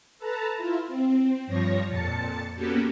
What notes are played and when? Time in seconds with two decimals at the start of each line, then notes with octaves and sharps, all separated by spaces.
0.18 A4 B4 A5 A#5
0.57 E4 F4
0.88 C4
1.47 G2 F3 C#5 A#6
1.88 F2 A#2 A5 A6 C#7
2.55 A#3 B3 C#4 F#4 G4 A4